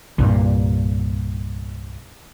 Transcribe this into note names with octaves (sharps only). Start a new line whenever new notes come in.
C2 G2 A#2